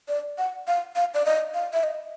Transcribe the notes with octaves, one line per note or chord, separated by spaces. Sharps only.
D5
F#5
F5
F5
D5
D#5
F5
E5
D#5